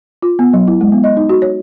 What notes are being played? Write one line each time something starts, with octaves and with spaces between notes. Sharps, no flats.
F4
B3
F#3
E4
G#3
B3
D#5
D#4
F#4
C#5